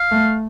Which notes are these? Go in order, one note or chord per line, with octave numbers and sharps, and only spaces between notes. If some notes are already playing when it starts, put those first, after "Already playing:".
Already playing: F5
A3